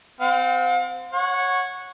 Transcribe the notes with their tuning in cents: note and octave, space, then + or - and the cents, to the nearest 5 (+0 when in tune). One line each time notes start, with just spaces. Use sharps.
C4 -25 F5 +40
C#5 -10 F#5 -15